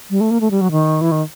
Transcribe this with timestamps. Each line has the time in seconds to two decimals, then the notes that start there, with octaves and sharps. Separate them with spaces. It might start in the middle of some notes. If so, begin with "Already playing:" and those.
0.10 G3
0.21 A3
0.31 A#3
0.41 A3
0.51 G3
0.61 F#3
0.71 D#3
1.01 E3
1.12 D#3